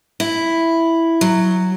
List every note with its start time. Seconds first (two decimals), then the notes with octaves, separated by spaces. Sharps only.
0.20 E4
1.21 F#3